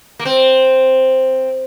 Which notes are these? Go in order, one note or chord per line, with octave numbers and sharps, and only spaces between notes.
A#3
C4